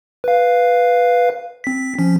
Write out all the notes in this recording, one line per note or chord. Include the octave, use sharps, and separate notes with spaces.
B4 F5
C4 B6
F3 C#4